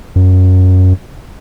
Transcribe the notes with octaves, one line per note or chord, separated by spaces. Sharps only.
F#2